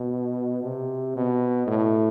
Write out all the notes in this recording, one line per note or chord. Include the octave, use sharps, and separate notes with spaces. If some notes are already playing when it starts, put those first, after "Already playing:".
Already playing: B2
C3
B2
A2